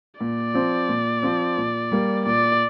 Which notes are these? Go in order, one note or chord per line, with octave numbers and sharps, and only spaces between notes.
A#2 D5
F3 C4
A#2
F3 C4
A#2
G3 A#3
A#2 D5